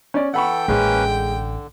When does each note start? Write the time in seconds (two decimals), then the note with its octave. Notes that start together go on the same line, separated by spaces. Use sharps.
0.14 C#4 D5
0.34 E3 A4 F#5 G5 B5 C#6
0.68 A1 G#3 A#3 C#4 B4
1.05 D3